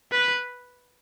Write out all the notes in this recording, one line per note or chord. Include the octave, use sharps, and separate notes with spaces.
B4